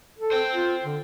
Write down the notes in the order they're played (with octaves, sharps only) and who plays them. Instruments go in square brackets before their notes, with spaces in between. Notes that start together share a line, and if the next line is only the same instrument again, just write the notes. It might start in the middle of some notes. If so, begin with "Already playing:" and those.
[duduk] A4
[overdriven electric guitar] C5 G5
[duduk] F4
D3